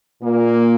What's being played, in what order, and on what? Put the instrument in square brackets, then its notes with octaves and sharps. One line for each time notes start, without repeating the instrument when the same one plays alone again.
[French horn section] A#2 A#3